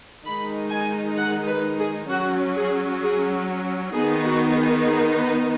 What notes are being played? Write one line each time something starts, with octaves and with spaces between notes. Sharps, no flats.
D#3 G#3 D#4 B5
G#5
F#5
B4
G#4
F#3 C#4 F#4
G#4
G#4
D#3 B3 D#4 G#4
F#4
G#4
G#4
B4